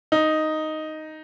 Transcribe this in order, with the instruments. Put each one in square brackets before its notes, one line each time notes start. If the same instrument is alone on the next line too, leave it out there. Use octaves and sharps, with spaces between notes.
[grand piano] D#4